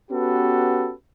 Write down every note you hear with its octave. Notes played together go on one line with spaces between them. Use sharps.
B3 C#4 F#4 G4 A4 B4